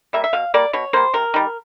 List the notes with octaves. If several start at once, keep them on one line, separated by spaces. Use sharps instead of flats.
G3 A#3 E5
E5
B2 F5
G3 A#3 D5
B2 C#5
G3 A#3 C5
C3 A#4
D#3 G3